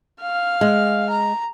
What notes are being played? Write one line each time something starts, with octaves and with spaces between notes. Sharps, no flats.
F5 F6
G#3
A#5